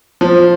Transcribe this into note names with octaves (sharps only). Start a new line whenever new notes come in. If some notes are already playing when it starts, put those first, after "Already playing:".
F3